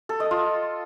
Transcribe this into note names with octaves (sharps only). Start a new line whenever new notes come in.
A4
D#5
F4